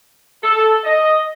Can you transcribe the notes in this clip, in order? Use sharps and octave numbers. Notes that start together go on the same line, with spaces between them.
A4
D#5